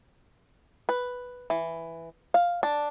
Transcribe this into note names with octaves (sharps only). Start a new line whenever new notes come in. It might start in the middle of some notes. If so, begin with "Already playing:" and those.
B4
E3
F5
D4